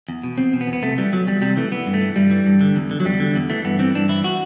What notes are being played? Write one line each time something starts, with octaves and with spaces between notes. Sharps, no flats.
E2
B2
E2 C4
B2
B3
E2
B3
C3 A3
E3 G3
E2 F#3
E2 G3
C3 G3
E3 A3
E3 B3
G2
A3
E3
G2 G3
E3
G2
D3
E2
D3
F#3
E2 G3
D3
E2
E3 A3
G2 B3
E3 C4
G2 D4
E3 E4
F#4